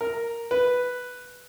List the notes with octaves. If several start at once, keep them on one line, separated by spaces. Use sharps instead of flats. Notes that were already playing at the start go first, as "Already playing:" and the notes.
A#4
B4